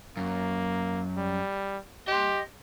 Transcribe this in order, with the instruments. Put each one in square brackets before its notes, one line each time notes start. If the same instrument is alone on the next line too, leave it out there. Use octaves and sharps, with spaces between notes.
[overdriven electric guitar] F#2 [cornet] A#3
[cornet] G3
[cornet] G4 [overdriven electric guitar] D#5 C6